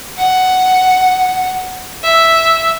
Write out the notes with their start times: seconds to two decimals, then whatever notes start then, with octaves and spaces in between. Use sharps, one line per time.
0.18 F#5
2.03 E5